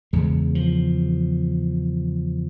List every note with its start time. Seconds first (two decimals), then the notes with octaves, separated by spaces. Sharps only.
0.13 E2 C#3 G#3
0.55 F3